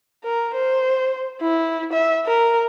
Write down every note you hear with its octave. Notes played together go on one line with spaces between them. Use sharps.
A#4
C5
E4
E5
A#4